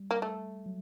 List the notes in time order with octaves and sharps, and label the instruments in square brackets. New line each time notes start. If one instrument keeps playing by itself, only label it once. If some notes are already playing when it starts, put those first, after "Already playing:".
Already playing: [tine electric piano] G3
[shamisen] A#3
A3
[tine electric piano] F#3